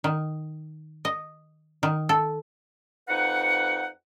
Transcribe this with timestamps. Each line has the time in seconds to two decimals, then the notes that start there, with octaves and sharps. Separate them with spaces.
0.04 D#3
1.05 D#5
1.83 D#3
2.09 A4
3.08 F2 D#4 B4 F#5